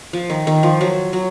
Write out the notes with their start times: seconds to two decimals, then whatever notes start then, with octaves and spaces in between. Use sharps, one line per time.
0.13 F3
0.30 D#3
0.47 D#3
0.63 F3
0.81 F#3
1.13 F#3